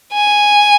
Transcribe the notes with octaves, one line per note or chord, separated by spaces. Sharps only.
G#5